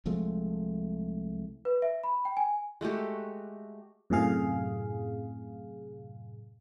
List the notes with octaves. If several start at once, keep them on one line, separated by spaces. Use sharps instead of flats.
C2 F3 G#3 A3
B4
E5
B5
G5
G#5
G#3 A3 F#4 G4
F#2 A2 C3 G#4 F5